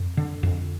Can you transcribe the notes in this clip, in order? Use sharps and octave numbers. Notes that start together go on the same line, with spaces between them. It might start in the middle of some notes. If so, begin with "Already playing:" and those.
Already playing: F2
D3
F2